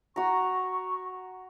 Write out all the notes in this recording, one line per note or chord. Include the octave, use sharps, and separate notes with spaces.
F#4 A#5 C#6